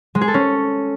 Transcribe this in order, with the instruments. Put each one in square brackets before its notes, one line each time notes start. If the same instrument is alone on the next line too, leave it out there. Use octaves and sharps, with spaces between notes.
[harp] G#3
G#4
A4
C#4